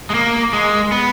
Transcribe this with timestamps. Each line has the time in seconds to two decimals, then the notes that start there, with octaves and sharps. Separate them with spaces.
0.10 G#3
0.14 A#3
0.53 G#3
0.92 B3